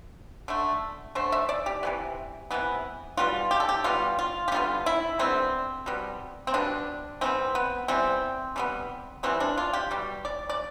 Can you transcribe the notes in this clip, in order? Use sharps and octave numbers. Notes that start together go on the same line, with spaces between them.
D3 A3
D3 A3 C5
E5
D5
G4
C3 E3 B3
C3 E3 B3
B2 G3 B3 F4
G4
A4
G4
B2 G3 B3 F4
F4
G4
D3 G3 B3 F4
E4
D3 G3 B3 C4
B2 G3 B3
C4
B2 G3 B3 D4
E3 G3 B3 C4
B3
E3 G3 B3 C4
E3 G3 B3
E3 G3 B3 C4
D4
F4
G4
B2 G3
D5
D5